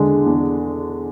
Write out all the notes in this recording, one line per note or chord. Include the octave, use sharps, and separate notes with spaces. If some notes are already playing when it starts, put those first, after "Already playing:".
Already playing: E2 D3 G#3
E2